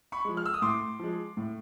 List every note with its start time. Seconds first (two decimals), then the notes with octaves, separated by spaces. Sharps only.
0.12 B5 C#6
0.25 F3 G#3
0.37 F6
0.46 E6
0.54 D#6
0.62 A2 C6 D6
1.00 F3 G#3
1.37 A2